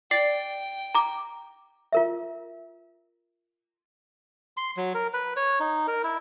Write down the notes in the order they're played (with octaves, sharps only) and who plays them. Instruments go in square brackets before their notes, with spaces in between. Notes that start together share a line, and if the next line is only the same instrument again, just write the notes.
[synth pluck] D5 [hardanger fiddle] G5 [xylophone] A6 C7
[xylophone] A#5 D6
[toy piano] F4 A#4 E5
[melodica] C6
F#3
A#4
B4
C#5
D#4
A#4
E4